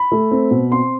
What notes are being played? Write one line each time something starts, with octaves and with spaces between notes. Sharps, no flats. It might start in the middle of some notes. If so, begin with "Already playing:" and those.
Already playing: B5
A3
C4
B2
C4 C6